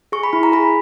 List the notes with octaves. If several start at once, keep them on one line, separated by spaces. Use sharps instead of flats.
G#4 C#6
B5
E4
A#5
G#4 B5